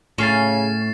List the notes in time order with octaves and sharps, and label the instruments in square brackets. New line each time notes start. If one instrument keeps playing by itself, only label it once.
[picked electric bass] A2 [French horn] C#3 [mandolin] C#4 [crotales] A6 C7 E7